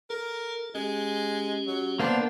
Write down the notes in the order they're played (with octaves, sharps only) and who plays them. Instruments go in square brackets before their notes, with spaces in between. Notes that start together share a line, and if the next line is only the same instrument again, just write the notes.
[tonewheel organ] A4 [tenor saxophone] A#4
[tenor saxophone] G#3 [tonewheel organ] C#4 G4
[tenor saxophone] F#3
[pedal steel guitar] A#3 B3 D4 [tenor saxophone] C5 [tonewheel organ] E5